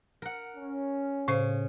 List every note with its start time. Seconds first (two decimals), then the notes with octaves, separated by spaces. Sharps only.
0.22 A#4 F#5
0.55 C#4
1.28 A2 C#3 C5